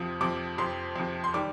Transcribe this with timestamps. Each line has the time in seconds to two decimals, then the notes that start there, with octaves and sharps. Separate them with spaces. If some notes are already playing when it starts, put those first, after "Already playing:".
Already playing: F2 C3 F3 D#6
0.21 F2 C3 F3 D6
0.58 F2 C3 F3 C6
0.96 F2 C3 F3
1.24 C6
1.34 D#3 G3 D6